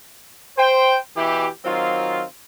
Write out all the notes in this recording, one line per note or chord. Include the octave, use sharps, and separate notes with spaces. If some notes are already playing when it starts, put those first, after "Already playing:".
C5 G5
B2 E3 E4 G4
D#3 F#3 C4 F4